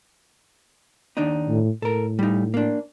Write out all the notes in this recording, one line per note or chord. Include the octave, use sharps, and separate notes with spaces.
D#2 D4 D#4
A2
A2 A4 A#4
G3 D#4
A#3 D4